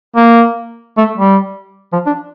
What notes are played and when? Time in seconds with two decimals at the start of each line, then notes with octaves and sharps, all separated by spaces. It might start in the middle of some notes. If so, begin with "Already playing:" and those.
0.16 A#3
0.98 A3
1.18 G3
1.93 F3
2.07 D4